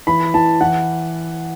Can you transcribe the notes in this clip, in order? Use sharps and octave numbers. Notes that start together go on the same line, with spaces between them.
E3 B5
E3 A5
E3 F#5